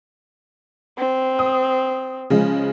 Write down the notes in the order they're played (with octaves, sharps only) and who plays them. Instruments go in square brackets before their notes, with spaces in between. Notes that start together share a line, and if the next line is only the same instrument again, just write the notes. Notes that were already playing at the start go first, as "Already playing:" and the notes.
[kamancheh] C4
[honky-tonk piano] D#6
C#3 F3 G#3